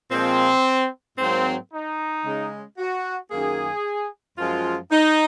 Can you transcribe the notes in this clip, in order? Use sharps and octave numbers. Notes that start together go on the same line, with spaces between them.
A#2 F3 G#3 C4
G#2 F#3 A#3 C4
D#4
C#3 G#3
F#4
F#2 D#3 A#3 G#4
F#2 F3 G#3 F4
D#4